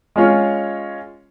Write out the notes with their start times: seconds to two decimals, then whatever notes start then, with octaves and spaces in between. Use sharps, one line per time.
0.16 G#3 C#4 F4 C#5